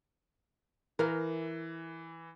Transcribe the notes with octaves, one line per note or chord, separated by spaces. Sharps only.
E3 A#4 F5